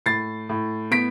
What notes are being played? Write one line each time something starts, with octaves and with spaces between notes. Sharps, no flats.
A2 A6 C7
A2
B3 B6 D7